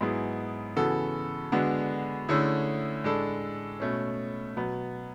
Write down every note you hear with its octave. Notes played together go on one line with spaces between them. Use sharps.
G#2 F#3 B3 E4 G#4
C#3 E3 B3 F#4 A4
D3 G#3 B3 D4 F#4
D3 A3 C#4 E4 G#4
A2 G#3 D4 A4
B2 A3 C#4
B2 F#3 B3